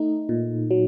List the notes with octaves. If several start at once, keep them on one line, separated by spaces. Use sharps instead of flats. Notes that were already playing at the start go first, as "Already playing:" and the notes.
Already playing: A3 D#4
A#2
F#3